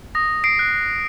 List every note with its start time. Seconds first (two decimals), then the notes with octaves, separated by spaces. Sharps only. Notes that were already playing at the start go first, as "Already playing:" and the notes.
0.15 D#6 A#6
0.44 C7 D7
0.59 F#6